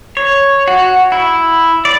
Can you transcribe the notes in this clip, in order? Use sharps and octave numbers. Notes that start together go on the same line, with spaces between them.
C#5
F#4
E4
D5